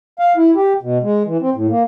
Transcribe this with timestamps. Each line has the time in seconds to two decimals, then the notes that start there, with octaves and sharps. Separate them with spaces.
0.19 F5
0.37 E4
0.55 G4
0.82 B2
1.03 G#3
1.26 E3
1.41 C4
1.55 A2
1.70 A#3